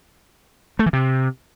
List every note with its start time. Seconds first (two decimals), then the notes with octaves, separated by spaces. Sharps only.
0.79 A3
0.86 E3
0.93 C3